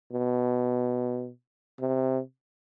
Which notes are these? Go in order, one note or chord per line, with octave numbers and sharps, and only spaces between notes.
B2
C3